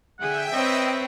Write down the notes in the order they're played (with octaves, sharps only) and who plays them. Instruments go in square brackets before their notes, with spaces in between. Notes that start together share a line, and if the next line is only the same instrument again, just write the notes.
[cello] D3 G#4 [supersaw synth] E5 G5 [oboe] F#5
[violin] C4 [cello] B4 C#5 [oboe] D#5